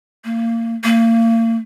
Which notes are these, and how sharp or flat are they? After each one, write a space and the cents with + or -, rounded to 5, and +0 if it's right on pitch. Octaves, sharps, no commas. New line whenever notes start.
A#3 -25
A#3 -35